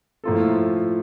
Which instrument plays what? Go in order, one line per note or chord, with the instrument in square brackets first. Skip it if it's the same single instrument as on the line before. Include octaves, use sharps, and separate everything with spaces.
[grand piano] A2 F3 A#3 F4 A4